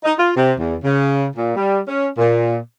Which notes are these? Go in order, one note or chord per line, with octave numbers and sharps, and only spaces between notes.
D#4
F4
C3
E2
C#3
A#2
G3
C#4
A#2